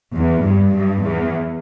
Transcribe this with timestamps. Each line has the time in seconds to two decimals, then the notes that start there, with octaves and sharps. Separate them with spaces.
0.15 E2
0.44 G2
0.74 G2
1.03 E2